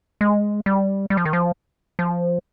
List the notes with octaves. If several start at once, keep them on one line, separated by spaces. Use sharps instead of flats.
G#3
G3
G3
F3
D#3
F3
F3